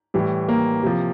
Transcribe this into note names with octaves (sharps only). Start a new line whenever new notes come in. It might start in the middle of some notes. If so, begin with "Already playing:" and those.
A2 E3 G3
A#3
C3 F3